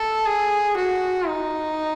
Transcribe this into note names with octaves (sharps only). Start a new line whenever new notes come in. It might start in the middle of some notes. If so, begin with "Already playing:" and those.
Already playing: A4
G#4
F#4
D#4